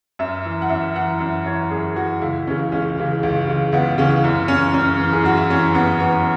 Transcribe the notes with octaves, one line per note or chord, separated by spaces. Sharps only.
F#2 E5
E3
F#5
F#2 E5
E3 F#5
F#2 E5
E3 C#5
F#2 G#4
E3 F#4
C#2 E4
C#3 E3 C#4
C#2 C#4
C#3 E3
C#2
C#3 E3
C#2 B3
C#3 E3 C#4
F#2 E4
E3 C#4
F#2 C#4
E3
G#4
F#2 F#4
E4
E3 C#4
F#2 B3
E3 B3